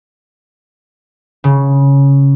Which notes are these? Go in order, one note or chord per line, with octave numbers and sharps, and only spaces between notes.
C#3